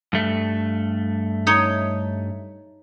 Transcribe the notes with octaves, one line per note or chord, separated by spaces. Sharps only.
G2 A3
D#4 C#5